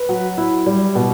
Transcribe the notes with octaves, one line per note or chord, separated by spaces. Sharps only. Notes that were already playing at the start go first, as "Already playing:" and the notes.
Already playing: B4
F#3
E4
G3
B2